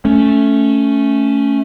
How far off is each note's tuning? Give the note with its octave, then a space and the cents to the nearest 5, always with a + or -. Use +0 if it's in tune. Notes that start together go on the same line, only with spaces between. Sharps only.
A3 +0 C#4 +5